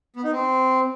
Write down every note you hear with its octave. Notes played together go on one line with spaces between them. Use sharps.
B3
D#4
C4